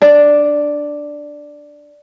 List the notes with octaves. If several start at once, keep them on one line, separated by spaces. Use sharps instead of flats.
D4 D5